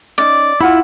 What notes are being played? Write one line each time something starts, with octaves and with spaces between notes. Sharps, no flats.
C#4 D#4 D5
E4 F4 F#5 B5